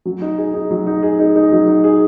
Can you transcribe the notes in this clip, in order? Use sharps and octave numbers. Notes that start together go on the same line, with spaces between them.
F#3
D#4
G#4
D#4
F#3
D#4
G#4
D#4
D#4
F#3
D#4
G#4